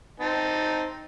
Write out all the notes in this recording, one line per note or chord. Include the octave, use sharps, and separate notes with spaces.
C4 D#4 A5